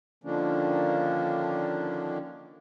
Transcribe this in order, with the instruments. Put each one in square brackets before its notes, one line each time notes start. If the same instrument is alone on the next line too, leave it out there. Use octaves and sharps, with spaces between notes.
[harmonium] D3 D#3 F3 A#3 C#4 D4